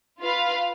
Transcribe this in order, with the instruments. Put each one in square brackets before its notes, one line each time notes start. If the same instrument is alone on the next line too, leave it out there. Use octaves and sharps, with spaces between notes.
[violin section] F4 B4 F5